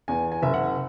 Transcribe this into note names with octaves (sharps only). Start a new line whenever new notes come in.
E2 G#5
G#5
F#1 E5
F#5